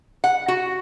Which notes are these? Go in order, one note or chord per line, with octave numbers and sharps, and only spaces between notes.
F#5
F#4